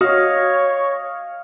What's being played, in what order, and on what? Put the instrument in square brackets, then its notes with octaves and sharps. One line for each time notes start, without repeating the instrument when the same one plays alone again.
[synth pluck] F#4 [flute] C#5 [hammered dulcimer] D#5 F5